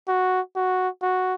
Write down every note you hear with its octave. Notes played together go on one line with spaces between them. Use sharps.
F#4
F#4
F#4